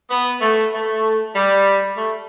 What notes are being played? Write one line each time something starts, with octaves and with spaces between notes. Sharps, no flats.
B3
A3
A3
G3
A3